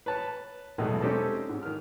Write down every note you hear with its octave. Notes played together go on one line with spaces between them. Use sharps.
B4 C#5 A5
E2 B2 F#3 G#3 A3 D#4
G#3 C4 C#4 D#4 G4 A4
G#2
D#3 F6